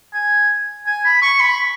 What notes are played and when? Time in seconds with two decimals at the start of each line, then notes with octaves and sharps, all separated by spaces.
0.14 G#5
0.86 G#5
1.05 B5
1.22 C#6
1.40 B5